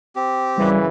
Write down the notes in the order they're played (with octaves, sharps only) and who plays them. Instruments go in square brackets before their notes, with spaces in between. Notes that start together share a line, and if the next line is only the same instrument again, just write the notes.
[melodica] C4 G4
[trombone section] F#2 C#3 E3 [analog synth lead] G3